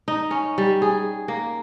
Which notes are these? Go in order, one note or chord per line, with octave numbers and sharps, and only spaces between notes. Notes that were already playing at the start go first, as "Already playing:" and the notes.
D#4
C#4
G3
G#4
A#3